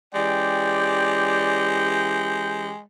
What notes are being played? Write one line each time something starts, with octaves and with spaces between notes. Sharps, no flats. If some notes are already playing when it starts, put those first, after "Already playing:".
E3 G#3 C#4 G4 D5 G5